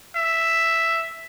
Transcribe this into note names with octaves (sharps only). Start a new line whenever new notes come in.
E5